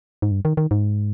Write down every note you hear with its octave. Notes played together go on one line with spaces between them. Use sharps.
G#2
G2
D#3
D#3
G#2